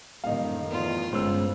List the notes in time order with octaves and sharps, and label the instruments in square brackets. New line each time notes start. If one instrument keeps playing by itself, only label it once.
[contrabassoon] D#1 [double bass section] F#2 A2 D#3 [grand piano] D#4 F5
[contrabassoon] E2 [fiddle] F4
[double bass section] G1 A2 B3 [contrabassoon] C#2 [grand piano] C5 E6